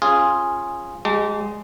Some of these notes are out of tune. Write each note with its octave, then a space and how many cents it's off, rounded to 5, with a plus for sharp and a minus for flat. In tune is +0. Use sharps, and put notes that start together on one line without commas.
C#4 -15 F4 +0 G#4 -5
G#3 +0 G4 -35 A5 +25